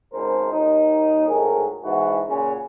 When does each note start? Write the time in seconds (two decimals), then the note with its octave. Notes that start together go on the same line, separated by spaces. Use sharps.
0.13 G#1 C#2 F#2 G#3 A#4 C5
0.52 D#2 D#4
1.27 G#1 A2 F#3 G#4 A#4
1.83 B1 G#2 E3 E4 F#4
2.26 A#2 C#3 F#3 C#4 F4